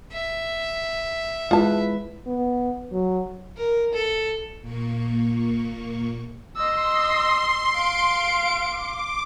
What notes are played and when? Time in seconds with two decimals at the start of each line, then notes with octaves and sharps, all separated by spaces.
0.12 E5
1.51 G#3 E4 F4 B4 A5
2.27 B3
2.92 F#3
3.57 A#4
3.93 A4
4.61 A#2 A#3 C#6
6.57 D#5 C6 E6
7.75 F5 D7
8.63 D6